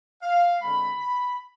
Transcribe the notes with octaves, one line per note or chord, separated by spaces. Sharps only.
F5
D3 G#3 C4 B5
B5